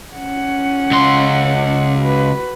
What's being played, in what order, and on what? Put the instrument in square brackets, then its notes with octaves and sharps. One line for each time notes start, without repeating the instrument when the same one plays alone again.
[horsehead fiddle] C#4 F#5
[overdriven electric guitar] C#2 C6
[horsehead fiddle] F#4 B4